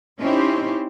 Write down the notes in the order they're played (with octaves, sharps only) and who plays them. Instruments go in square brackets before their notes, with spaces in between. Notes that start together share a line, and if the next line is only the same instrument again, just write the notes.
[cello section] C4 C#4 D#4 E4 G4 C5